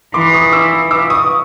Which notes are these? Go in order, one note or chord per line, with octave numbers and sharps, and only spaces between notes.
E3 C6 D6
C#6 D#6
D6 E6
D6 E6
C#6 D#6